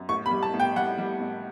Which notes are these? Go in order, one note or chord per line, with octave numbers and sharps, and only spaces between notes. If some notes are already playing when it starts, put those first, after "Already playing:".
Already playing: F#2
A2 C#6
B5
G3
A5
A2
G5
G3 F#5
G3
A2